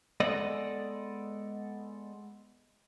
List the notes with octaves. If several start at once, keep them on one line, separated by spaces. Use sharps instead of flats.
G#3 B3 A4 D5 D#5